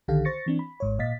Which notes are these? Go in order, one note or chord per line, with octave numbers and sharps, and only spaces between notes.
B1 D3 D#3 G4 A4 F5
C5 C#6 A6 A#6 C#7
E3 C4 D4
B5
G#1 G#2 C#5
A#2 D#5 F5 A6 B6